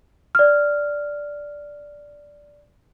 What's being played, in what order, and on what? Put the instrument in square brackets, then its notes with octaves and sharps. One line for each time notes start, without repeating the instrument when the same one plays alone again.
[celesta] D5 F6